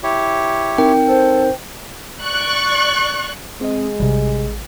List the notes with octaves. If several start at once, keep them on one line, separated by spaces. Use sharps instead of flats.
E4 G4 C#5
C4 D#4 A#4 G5
A4 C5
D5 C#6 F#6
G#3 C4 D#5
A1 C3 G3